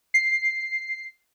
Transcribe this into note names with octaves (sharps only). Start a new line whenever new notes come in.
C7